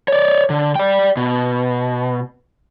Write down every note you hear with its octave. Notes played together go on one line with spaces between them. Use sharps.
C#5 D5
D3
D5 G5
B2